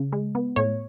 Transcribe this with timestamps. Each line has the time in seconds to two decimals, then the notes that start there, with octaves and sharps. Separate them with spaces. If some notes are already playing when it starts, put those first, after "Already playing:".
Already playing: C#3
0.12 G#3
0.35 B3
0.56 A2 C#5